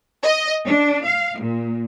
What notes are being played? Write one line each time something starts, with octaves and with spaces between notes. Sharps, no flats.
D#5
D4
F5
A#2